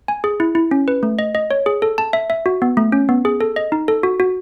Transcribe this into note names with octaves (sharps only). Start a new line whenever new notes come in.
G#5
G#4
E4
E4
C#4
B4
A3
D#5
D#5
C#5
G#4
A4
A5
E5
E5
F#4
B3
A3
C#4
B3
G#4
A4
D#5
D#4
A4
F#4
F#4